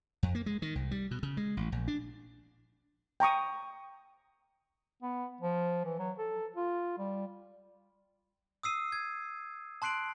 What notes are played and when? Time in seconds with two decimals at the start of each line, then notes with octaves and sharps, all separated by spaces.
0.23 F2
0.35 A#3
0.46 G#3
0.62 D#3
0.75 C2
0.91 G3
1.11 B2
1.23 C#3
1.37 G#3
1.57 A1
1.72 A#1
1.88 D4
3.20 G5 A#5 C#6 D#6
5.02 B3
5.41 F3
5.85 E3
5.99 F#3
6.18 A4
6.56 F4
6.98 G3
8.63 D#6 E6 C7 D#7
8.92 G#6
9.82 A5 C6 F#6 C7 D7 F#7